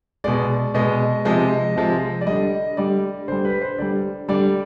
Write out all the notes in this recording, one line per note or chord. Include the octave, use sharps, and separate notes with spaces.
B2 G#3 D5
B2 G#3 D#5
C3 F3 G#3 D#5
C3 F3 G#3
D5
D3 G3 D#5
D3 G3 D5
D3 G3 C5
B4
C5
D3 G3 D5
D3 G3 D5